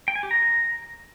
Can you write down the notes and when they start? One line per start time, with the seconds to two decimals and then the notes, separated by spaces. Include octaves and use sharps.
0.08 G5
0.15 G#5
0.23 G4
0.31 A#5